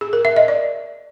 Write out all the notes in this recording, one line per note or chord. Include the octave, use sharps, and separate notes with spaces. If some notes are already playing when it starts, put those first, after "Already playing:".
G#4
A#4
E5
D#5
D5